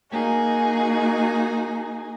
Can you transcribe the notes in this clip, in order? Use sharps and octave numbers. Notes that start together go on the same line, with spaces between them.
A#3 D#4 F#4 G#4 G#5